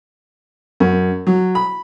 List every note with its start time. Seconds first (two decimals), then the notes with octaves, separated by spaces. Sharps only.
0.80 F#2
1.27 F#3
1.55 B5